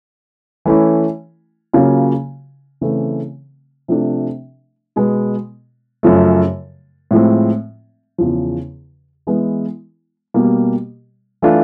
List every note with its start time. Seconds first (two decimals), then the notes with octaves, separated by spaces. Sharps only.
0.65 E3 A3 C#4 E4
1.73 C#3 F#3 A#3 C#4 F4
2.81 C#3 E3 A3 C4
3.88 C3 F3 A3 D4
4.96 B2 G#3 B3
6.03 F#2 C#3 F3 A3
7.11 A2 F3 G#3 C4
8.18 E2 C#3 F3
9.27 E3 G#3 B3 E4
10.34 B2 G3 A#3
11.42 E3 A3 D4 F4